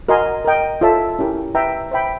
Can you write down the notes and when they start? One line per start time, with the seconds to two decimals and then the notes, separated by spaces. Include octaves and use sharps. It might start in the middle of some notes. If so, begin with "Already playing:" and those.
0.09 F#4 A#4 D#5 G#5 C6
0.45 A#4 D#5 G5
0.81 F4 A4 C#5 E5 A5
1.19 C#4 E4 G4 A#4
1.55 B4 E5 G5 A#5
1.91 C5 E5 G5 B5